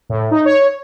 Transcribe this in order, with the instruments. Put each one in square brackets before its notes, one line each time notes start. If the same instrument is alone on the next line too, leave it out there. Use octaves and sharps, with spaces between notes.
[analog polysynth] A2
D#4
C#5